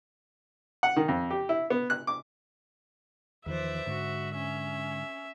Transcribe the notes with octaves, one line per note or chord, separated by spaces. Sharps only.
F#5
D#3
F2
G4
E4
B3
F#6
D6
E2 D#3 F3 B4 C5 D5 E5
G#2 D3 F#4
C#4 E5